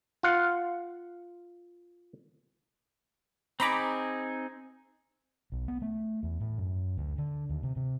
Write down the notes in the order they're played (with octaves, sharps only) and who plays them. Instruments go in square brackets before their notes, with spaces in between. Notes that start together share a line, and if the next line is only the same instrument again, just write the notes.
[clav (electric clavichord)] F4 F5 F#5
[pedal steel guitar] C4 D#4 G#4 [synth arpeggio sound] A#5 B5 D6
[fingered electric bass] B1
B3
A3
E2
A2
F#2
D2
D3
D#2
C3
C3